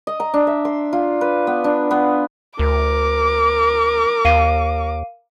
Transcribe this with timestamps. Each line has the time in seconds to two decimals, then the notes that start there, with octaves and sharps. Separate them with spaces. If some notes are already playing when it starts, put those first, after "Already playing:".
0.07 D#5
0.20 A#5
0.34 D4
0.47 E5
0.65 C6
0.93 F4
1.21 B4
1.47 B3
1.64 D4
1.91 B3
2.59 D2 A#4 D6
4.25 D#2 F5 C7 D#7